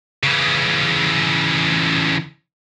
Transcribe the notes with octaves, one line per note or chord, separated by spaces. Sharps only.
C#3 E3